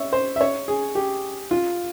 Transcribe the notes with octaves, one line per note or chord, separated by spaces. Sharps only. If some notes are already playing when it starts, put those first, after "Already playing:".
Already playing: C#5 E5
C5
E5
C#5
G#4
G4
F4